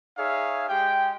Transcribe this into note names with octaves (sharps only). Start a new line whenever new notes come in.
D#4 G#4 C#5 E5 F5
G#3 G4 G5